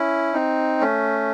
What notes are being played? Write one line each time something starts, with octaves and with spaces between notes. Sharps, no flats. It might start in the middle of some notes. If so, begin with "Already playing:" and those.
Already playing: C#4 E4
C4 D#4
A3 C#4